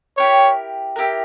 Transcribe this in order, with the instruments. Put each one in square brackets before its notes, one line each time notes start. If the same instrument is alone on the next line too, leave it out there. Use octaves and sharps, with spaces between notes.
[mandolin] E4 G4 A#4 [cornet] C#5
[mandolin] E4 G4 A#4